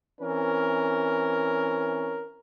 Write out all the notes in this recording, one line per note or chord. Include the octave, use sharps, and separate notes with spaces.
E3 C4 C#4 A#4